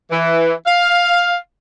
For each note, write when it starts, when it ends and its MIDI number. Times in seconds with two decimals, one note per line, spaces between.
0.10 0.52 52
0.65 1.36 77